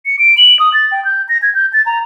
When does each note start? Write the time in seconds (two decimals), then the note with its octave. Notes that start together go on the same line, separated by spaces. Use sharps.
0.06 C#7
0.19 D7
0.38 F#7
0.59 D#6
0.74 A6
0.92 G5
1.05 G6
1.29 A#6
1.43 G#6
1.55 G6
1.73 A6
1.86 A#5